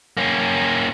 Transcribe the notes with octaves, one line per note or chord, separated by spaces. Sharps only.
A#3 C#4